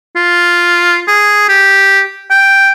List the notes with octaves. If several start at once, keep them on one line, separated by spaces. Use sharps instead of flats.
F4
G#4
G4
G5